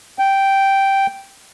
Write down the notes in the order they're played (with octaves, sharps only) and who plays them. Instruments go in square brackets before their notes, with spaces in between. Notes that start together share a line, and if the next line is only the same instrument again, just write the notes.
[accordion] G5